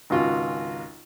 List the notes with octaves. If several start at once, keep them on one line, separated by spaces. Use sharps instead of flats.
G#1 C#2 F4 F#4